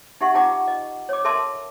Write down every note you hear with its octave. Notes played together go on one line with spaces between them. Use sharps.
D#4 G4 E5 F#5 C#6
D#4 F4 F#5 G#5 A#5 D6
D#5
C#5 D6
A4 A#4 E5 A5 C6 D6